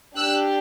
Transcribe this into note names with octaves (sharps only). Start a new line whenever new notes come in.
D4 G4 E6 F#6